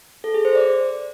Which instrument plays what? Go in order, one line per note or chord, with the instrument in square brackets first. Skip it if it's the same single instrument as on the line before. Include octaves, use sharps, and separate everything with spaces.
[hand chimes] A4
G#4
C5
D5